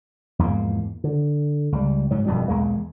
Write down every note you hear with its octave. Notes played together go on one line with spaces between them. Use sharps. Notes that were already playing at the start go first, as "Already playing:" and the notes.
E2 G#2 F3 A#3
D3
C#2 G3
G#2 F#3
E1 F2 B2 G3
B1 E2 G#3 A#3